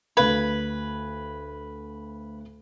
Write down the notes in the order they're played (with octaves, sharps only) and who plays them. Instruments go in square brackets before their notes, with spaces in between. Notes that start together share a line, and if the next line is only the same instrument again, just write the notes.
[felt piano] D2 F5 G#6 [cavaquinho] B4 B5